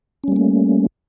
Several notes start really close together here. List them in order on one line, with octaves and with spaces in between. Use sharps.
C#4 G3 A#3 A3